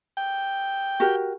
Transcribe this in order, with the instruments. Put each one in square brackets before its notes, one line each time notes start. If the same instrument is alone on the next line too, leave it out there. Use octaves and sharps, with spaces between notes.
[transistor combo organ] G5
[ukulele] F#4 G4 A#4